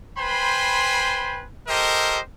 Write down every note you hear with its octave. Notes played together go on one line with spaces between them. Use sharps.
B4 C5 G5 G#5 B5 C6
G4 A4 A#4 C5 D#5